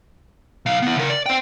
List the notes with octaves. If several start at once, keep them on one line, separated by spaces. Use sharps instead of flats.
B1 F5
B3 E4
C#3 A#4
D5
C5 G5